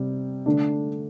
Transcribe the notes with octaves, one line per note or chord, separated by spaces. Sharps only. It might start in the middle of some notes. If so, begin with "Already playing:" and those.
Already playing: C3 G3
D3 A3 D4